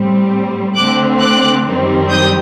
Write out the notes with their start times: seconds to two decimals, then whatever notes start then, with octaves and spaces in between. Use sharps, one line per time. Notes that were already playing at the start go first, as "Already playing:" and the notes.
Already playing: A2 G3 C4
0.75 D3 A3 C4 D6 F#6
1.20 D6 F#6
1.65 F#2 D#3 G3 C4
2.10 D#6 G6